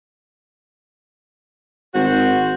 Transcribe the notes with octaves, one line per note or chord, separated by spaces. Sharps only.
G#1 F#4 C5